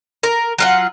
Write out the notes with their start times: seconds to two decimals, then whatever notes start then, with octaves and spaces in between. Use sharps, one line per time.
0.23 A#4
0.58 F#3 F4 F#5